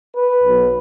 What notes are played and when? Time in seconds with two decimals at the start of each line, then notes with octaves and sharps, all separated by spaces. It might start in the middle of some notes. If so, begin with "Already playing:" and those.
0.14 B4
0.44 B1 B2 F#3